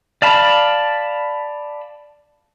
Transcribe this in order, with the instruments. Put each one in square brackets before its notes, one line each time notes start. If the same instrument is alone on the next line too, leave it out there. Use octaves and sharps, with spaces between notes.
[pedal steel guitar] D5 F5 A5 B5